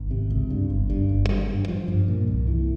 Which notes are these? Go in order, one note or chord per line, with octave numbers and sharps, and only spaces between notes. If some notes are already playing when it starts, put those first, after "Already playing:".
Already playing: G#1
C3
C#2
G2
G1
G2
G1
G3
G2
F3
G2
A#2
C2
E3